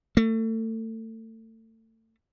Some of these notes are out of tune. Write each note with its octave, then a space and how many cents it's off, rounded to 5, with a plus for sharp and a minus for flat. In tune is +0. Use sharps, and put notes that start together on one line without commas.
A3 +30